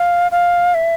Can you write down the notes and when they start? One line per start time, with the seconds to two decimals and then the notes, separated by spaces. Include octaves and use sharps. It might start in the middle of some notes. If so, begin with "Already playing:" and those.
Already playing: F5
0.32 F5
0.74 E5